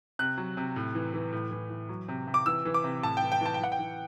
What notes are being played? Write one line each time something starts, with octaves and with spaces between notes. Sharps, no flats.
C3 F#6
F#3
C3
A2
E3
E3
A2
E3
E3
F#3
C3
C3
D6
E3 E6
E3
D6
C3
A2 A5
G5
E3
G5
E3 A5
G5
E3 F#5
G5
E3